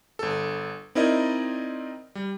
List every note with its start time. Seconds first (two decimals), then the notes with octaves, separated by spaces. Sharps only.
0.19 G1 A4
0.95 C4 D#4 E4 A#4 D5 D#5
2.15 G3